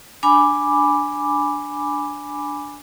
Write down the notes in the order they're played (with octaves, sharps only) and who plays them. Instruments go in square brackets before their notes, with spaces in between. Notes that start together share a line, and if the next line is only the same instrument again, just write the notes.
[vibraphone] D4 G#5 B5 D6